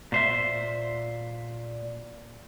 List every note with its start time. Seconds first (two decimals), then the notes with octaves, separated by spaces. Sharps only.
0.12 A#2 C5 E5